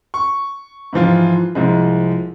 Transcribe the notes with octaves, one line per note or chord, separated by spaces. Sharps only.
C#6
G#2 E3 F3 F4
C2 F3 G#3